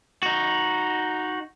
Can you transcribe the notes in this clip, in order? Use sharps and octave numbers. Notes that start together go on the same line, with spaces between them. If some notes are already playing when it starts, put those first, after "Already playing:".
D#4 F#4